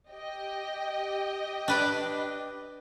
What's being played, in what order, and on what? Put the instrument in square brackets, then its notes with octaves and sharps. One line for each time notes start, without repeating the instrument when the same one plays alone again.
[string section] G4 D#5 G5
[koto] D4 B4 D5